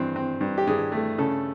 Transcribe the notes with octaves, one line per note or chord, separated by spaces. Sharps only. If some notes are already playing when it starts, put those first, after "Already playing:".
Already playing: G2 E3 C4
C4
G2
G4
G2 G#4
A3
C#3 A4